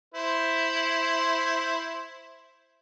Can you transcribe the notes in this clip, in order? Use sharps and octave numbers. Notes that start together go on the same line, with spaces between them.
E4 C5